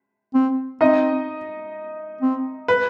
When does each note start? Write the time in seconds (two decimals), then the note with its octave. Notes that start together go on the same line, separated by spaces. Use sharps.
0.34 C4
0.81 C4 D#4 D#5
2.21 C4
2.68 B4